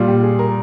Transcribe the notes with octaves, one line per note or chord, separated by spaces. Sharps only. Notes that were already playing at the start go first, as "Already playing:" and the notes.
Already playing: A#2 G3 F4
G4
G#4
A#4